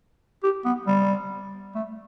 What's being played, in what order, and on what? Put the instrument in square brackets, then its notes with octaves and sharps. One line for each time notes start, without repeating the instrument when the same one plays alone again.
[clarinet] G4
B3
G3
A3